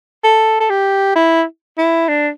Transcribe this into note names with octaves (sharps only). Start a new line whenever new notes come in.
A4
A4
G4
E4
E4
D4